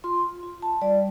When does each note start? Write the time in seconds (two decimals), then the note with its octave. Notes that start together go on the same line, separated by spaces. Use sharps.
0.04 F4 C6
0.43 F4
0.62 A5
0.81 G3 D5